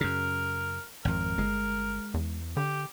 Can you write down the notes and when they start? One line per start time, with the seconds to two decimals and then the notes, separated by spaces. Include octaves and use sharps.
0.01 F#2 C#3 A#4
1.05 G#1 F2 A#4
1.38 G1 G#3
2.14 E2
2.57 D3 G4